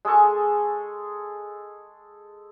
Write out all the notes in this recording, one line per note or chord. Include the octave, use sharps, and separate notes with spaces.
G#3 G#4 A4 C#6